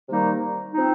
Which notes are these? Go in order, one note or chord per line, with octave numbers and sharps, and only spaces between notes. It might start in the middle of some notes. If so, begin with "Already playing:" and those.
C3 D#3 G3 A#3 D#4
F3 C4 D#4